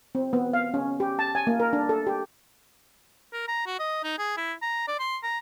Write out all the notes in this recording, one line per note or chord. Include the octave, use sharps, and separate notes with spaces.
C4
B3
F5
C#4
G4
A5
G#5
A#3
A#4
D4
A4
G4
A#4
A#5
F#4
D#5
D#4
G#4
E4
A#5
D5
C6
A#5